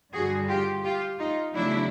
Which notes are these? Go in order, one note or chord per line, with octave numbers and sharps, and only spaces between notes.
G2 D3 G3 F#4 G#4
F4 G4
F4 G4
D#4 F4
E2 C#3 F#3 A3 D4 E4